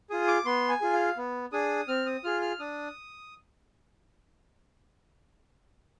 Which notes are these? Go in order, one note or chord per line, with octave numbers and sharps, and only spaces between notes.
F4 G#4 D#6
D6
B3 C6
G#5
F4 G#4
F5
B3
D4 G#4 D#6
C4 F6
D#6
F4 G#4 F6
F6
D4 D#6